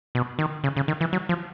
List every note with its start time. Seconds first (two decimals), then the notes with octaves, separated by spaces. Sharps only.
0.15 B2
0.39 D#3
0.64 C#3
0.76 C#3
0.88 D#3
1.01 E3
1.13 F#3
1.29 F3